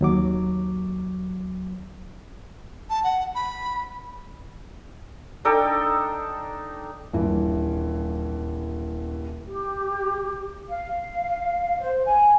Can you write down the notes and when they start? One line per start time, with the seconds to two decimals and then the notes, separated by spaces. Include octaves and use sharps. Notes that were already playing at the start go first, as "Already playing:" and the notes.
0.01 D#2 F#3 D6
2.90 A5
3.04 F#5
3.35 B5
5.45 D4 D#4 A4 G5
7.13 D#1 G2 E3
9.48 G4
10.69 F5
11.80 C5
12.05 G#5